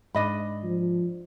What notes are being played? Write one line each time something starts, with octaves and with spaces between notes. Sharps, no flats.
G#2 D4 D#5 B5
F3